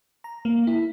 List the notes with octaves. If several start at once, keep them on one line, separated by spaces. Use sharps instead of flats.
A#5
A#3
E4